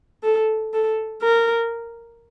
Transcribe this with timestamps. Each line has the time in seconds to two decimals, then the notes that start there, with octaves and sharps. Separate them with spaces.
0.23 A4
0.73 A4
1.22 A#4